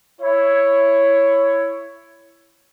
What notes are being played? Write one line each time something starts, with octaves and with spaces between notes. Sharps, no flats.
E4 C#5